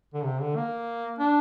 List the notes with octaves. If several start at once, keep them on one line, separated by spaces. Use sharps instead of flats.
D3
C3
D3
A#3
D4